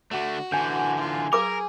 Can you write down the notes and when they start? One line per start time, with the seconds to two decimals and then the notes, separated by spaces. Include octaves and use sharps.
0.11 D3 A3 F#4
0.52 D3 E3 G#5 G6
0.99 F4
1.33 G#4 A#4 B4 D6